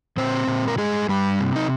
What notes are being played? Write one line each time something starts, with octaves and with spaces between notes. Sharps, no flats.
A#2 C4 C5
A#2
A#4
G2 G#3 G#4
G2 G3 G4
C3
D#4